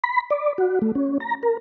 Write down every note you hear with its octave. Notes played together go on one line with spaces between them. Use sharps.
B5
D5
F#4
A3
C#4
A#5
A#4